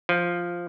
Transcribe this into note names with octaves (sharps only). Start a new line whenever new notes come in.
F3